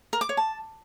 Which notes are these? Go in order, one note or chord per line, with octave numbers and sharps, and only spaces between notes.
A#4
D6
C#5
A5